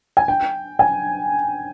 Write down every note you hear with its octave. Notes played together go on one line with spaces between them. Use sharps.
G#5
G5
G#5